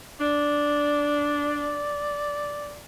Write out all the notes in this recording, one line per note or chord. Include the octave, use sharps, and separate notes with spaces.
D4 D5